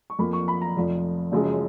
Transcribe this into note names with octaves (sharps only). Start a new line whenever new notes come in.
C#6
F2 F3 A#3 B5
C#6
B5
A#5
F1 F2 F3
F#1 F#2 C#3 F3 G#3